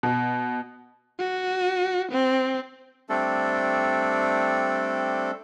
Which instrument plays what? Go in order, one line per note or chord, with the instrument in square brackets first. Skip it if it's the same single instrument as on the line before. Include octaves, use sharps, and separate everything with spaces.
[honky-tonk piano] B2
[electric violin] F#4
C4
[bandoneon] G3 A3 C4 D4 A4